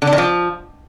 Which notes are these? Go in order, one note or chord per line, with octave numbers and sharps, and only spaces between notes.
D3
D4
D#3
F3